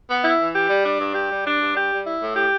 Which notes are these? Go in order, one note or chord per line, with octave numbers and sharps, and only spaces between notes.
B3
E4
E3
G4
G3
D4
G2
G4
G3
D4
G2
G4
G3
E4
A2
G4